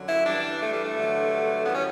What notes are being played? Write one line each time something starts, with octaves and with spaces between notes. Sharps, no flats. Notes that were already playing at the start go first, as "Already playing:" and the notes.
Already playing: F#2 D3 F#3
E4
G2 E3 G3 D4
A3
G3
A3
G2 D3 F#3
F#2 E3 G3 B3
C#4